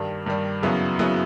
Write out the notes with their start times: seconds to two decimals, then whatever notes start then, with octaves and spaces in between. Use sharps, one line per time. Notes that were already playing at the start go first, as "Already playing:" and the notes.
Already playing: G2 D#3 G3
0.26 G2 D#3 G3
0.63 F#2 C#3 F#3 B3 E4
0.99 C#3 F#3 B3 E4